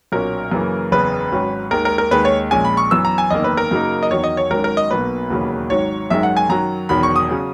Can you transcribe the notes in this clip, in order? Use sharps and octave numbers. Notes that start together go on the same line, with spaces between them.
B1 A#2 F#3 A#3 C#4 A#4
F#2 C#3 E3 A#3
F#1 E2 C#3 B4
G#1 G#2 F#3 C#4
D#2 D#3 G#3 A#4
A#4
A#4
D#2 D#3 G#3 D#4 B4
C#5
A#1 A#2 G#3 C#4 G#5
B5
C#6
F#2 E3 B3 E6
A#5
G#5
F#1 E2 D#3 A#3 D#5
B4
A#4
F#2 C#3 F#3 A#3 D#4
D#5
E2 D#3 F#3 C#5
D#5
C#5
G#1 G#2 F#3 C#4 A#4
A#4
D#5
B1 B2 A#3 B4
E1 D#2 C#3 F#3 A#3
G#1 G#2 F#3 C#5
G#1 F#2 D#3 G#3 E5
F#5
G#5
F#2 D#3 F#3 A#5
E1 E2 D#3 F#3 B5
C#6
D#6
C#3 F#3 C#4